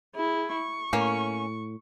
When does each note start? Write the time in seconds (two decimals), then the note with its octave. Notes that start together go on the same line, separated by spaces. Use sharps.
0.15 E4 G#4
0.53 C#6
0.93 A2 A#3 C#4